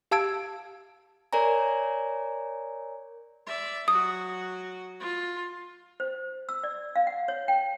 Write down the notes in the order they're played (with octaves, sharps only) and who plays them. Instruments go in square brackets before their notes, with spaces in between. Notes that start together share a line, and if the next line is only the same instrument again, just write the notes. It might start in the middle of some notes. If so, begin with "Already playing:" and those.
[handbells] G4 F5 A5 E6 G#6 D7
[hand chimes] A#4 C#5 D5 G#5 A#5
[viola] D5 E5
[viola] F#3 F#4 [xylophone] D#6
[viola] F4
[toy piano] C5
E6
D5
F5
F#5
C#5
G5